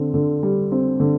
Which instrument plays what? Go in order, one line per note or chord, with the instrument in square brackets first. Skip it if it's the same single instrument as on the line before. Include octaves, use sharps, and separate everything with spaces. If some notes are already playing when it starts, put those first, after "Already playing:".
Already playing: [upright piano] D3 C4
D3
G3
C4
D3